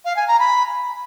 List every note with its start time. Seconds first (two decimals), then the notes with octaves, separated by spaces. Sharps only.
0.05 F5
0.16 G#5
0.28 A#5
0.39 B5